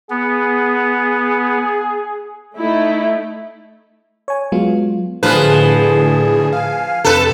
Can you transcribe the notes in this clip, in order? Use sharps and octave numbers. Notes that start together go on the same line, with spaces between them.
B3 G#4
A3 D#4 E4
C#5 G#5
F#3 G#3 B3 F4
A2 D3 F3 G#4 B4
F5 G#5
F2 C3 A4 B4